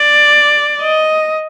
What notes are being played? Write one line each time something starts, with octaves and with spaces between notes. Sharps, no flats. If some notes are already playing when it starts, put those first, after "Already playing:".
Already playing: D5
D#5